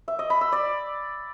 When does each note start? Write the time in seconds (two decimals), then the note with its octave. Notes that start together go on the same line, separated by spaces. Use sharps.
0.08 E5
0.19 D#5
0.30 B5
0.41 E6
0.52 D5